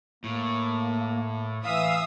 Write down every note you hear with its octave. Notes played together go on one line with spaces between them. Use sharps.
A2 A#3
E3 E5 F5 D#6 E6